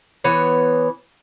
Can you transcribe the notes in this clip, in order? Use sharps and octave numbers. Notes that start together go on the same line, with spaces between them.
E3 B3 C#5